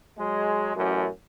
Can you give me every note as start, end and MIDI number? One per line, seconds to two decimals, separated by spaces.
0.19 0.76 54
0.19 0.76 56
0.77 1.06 33
0.77 1.06 42